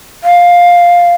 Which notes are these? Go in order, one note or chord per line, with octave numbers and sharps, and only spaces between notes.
F5